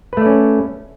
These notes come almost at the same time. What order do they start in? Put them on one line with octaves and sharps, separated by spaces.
B4 A3 D5 C#4